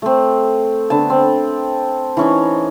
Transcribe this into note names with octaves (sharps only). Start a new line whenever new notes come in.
A3 C4
D3 B3 A5
C4
E3 C#4 D#4